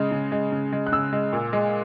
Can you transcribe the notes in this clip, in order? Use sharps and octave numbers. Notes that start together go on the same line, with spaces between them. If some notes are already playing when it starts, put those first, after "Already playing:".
Already playing: C#3 G#3
C#3
G#3
C#3
G#3
F#6
C#3 E6
G#3
A#2
G#3